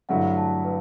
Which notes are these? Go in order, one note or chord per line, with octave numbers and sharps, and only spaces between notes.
G2 D3 F#3 A3 E4 F#5
A5
B4